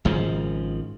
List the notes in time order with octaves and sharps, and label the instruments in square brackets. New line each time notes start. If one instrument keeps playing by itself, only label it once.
[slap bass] G#1 G#2 C#3 F3